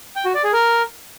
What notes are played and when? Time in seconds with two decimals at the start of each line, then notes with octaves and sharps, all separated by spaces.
0.16 G5
0.25 F#4
0.34 D5
0.44 G#4
0.53 A#4